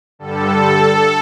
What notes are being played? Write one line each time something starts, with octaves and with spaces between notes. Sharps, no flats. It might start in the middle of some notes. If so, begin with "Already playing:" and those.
G2 D3 G3 A4